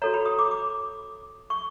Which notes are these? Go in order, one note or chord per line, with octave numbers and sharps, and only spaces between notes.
F#4 A4 C#5 A#5
B5
D#6
D6
D6
C#6